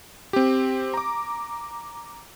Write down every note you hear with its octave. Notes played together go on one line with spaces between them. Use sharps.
C4 G4
A#5 D6